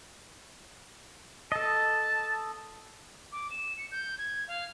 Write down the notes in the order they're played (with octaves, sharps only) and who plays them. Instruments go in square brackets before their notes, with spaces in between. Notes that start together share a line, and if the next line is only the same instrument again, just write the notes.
[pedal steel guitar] A4 D#5 [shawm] A5
[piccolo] D6
E7
C#7
G6
G#6
F5